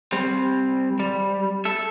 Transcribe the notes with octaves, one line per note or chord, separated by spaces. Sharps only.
G3 C4
G3
A4 E5